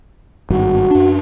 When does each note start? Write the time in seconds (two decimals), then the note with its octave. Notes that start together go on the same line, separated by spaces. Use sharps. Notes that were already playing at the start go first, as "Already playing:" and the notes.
0.50 G#1 G2 F#4
0.91 F#2 D4